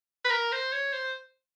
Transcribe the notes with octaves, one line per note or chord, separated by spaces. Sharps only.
B4
A#4
C5
C#5
C5